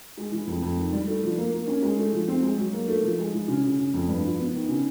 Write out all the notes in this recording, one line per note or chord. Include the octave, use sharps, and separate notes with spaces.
G#3
E3
F2
F2
D#3
G3
A3
F3
A#3
A#3
C#4
G#3
A3
F3
C4
G#3
F#3
A#3
A3
F3
G#3
E3
C#3
C#3
C#3
F2
G2
F3
B3
D#3
C#3